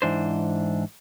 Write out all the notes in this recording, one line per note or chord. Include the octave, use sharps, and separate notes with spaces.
G#2 E3 D4 C5